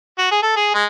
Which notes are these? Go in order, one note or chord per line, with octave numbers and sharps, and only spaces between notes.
F#4
G#4
A4
G#4
G#3